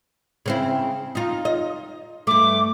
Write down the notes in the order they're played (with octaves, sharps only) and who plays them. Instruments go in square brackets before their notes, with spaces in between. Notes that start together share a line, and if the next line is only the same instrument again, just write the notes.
[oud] C#3 C4 E4
D#4 F4
D#5
[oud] G2 A3 [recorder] D6